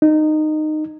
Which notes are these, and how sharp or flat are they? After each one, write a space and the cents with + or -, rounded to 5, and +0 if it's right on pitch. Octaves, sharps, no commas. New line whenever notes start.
D#4 -15